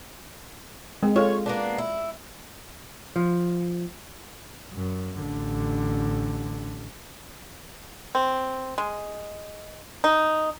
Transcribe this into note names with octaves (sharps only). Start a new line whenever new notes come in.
G#3 C4
F4 G#4 A4 C#5
A#3 B3 D4
E4
F3
F#2
A1 D3
C4
G#3
D#4